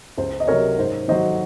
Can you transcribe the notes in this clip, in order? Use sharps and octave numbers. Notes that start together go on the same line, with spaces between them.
C#2 C5
D#5
C3 F#3 A#4 C#5
G#2 C5
D#3 F#3 C5 D#5